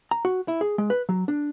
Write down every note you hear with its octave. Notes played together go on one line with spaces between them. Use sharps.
A#5
F#4
E4
G#4
G#3
B4
F#3
D4